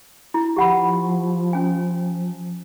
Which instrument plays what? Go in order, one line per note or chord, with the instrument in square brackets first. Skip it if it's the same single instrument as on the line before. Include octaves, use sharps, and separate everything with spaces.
[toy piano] E4
[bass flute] F3 [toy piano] G4 F#5 B5
[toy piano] C#4 G#5